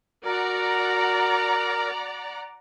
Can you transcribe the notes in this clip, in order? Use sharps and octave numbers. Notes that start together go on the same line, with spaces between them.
F#4 A#4 D5 F#5 A#5